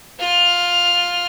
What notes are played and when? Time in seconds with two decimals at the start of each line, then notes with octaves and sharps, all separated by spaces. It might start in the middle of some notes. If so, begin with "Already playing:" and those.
0.20 F4 F6